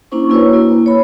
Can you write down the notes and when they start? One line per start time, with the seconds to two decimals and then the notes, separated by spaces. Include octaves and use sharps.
0.11 A#3 C#4 D4 E4 C5 C#6
0.30 A#3 E4 F#4 B4 C#5
0.53 A#3 E4
0.86 C#5 B5